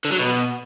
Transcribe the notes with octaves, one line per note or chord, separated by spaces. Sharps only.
D3
F#3
B2